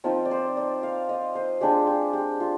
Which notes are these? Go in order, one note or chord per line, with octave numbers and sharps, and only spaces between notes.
F3 C4 D#4 A#4
D5
C5
D5
F5
D#5
C5
G#3 D4 F4 G4
G4
G4
F4